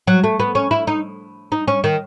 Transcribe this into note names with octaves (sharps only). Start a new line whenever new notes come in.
F#3
A3
B3
C#4
E4
D#4
D#4
C#4
D#3